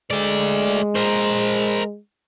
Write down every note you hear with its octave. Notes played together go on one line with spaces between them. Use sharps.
G#3 A3 D5
A#4 C5